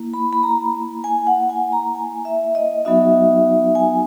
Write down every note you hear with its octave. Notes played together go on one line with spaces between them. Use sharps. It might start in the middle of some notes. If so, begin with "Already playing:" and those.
Already playing: A#3 E4
B5
B5
A#5
G#5
F#5
G#5
A#5
G#5
E5
D#5
F#3 B3 D#4 F#4 E5
G#5